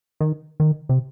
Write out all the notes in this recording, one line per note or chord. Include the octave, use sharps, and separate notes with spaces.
D#3
D#3
C3